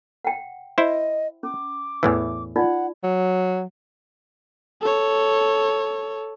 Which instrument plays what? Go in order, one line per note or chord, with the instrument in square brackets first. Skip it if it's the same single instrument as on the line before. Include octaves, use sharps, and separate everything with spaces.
[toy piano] F#5 G5
[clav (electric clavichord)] E4 C5 [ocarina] D#5
[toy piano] C#4 [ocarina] D6
[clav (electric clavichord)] E2 A2 E3
[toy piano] D#4 F4 D5 [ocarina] F#5
[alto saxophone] F#3
[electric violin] A4 C#5